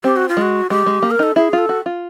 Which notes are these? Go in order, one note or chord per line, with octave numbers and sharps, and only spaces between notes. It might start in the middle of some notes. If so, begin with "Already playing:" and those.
C4 G4
F#4
F4
G#3 F#4
G#3 G4
G#3
A#3
A#4
D#4 A4
E4 G#4
F4
A4
F#4
F4